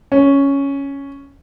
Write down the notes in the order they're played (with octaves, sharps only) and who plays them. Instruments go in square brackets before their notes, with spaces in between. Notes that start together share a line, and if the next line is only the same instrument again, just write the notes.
[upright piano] C#4